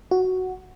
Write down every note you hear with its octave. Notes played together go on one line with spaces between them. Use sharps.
F#4